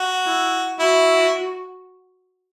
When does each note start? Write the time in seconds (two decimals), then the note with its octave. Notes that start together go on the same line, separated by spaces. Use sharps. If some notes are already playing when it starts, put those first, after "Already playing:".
Already playing: F#4
0.26 E4
0.79 E4 F#4